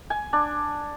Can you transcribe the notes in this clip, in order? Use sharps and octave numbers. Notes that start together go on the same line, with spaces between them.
G#5
D4